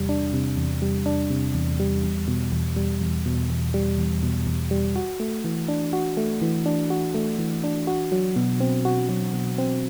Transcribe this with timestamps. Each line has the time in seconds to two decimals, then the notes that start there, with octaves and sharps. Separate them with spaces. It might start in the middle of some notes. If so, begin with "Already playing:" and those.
Already playing: E2 C3 G3
0.09 D4
0.33 C3
0.57 E2
0.82 G3
1.06 D4
1.30 C3
1.55 E2
1.80 G3
2.04 E2
2.28 B2
2.52 E2
2.76 G3
3.01 E2
3.26 B2
3.50 E2
3.74 G3
3.98 E2
4.23 B2
4.47 E2
4.71 G3
4.96 F#4
5.20 A3
5.44 E3
5.68 D4
5.93 F#4
6.17 A3
6.42 E3
6.66 D4
6.90 F#4
7.14 A3
7.39 E3
7.64 D4
7.87 F#4
8.12 F#3
8.36 B2
8.60 C4
8.85 F#4
9.09 F#3
9.34 B2
9.58 C4